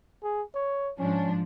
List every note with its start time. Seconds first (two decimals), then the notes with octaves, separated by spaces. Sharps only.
0.23 G#4
0.54 C#5
0.99 G#2 F3 C#4 D4